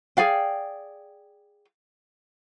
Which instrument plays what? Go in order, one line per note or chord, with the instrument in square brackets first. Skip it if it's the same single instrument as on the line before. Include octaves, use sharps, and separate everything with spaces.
[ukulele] G#4 D5 F5 G5